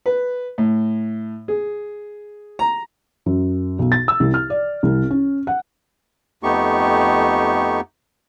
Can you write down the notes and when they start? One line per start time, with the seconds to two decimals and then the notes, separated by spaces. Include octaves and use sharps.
0.06 B4
0.58 A2
1.48 G#4
2.59 A#5
3.26 F#2
3.79 B1
3.92 A6
4.08 E6
4.20 C2
4.34 F6
4.50 D5
4.83 C2
5.11 C#4
5.47 F#5
6.43 F2 A3 B3 D#4 G4 C#6